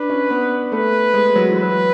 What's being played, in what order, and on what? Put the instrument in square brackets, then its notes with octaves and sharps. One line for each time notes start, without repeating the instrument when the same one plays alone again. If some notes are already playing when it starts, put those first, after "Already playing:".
Already playing: [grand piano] D4 [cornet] B4
[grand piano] C#4
B3
[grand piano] A3 [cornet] B4
[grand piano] G#3
F#3
E3
[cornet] B4
[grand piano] F#3